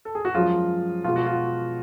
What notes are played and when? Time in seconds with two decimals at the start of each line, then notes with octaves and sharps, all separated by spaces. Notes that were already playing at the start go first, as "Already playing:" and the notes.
0.05 A4
0.15 G#4
0.25 F#4
0.35 F#2 F3 G#3 F4
1.04 B2 G#3 F4
1.16 F#4
1.27 F4